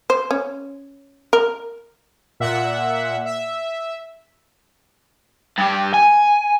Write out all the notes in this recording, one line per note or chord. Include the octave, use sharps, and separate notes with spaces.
C5
C#4
A#4
A#2 E5 F#5
E5
G2 G4
G#5